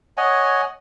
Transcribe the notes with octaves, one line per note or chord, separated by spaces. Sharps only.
C#5 D#5 F#5 G#5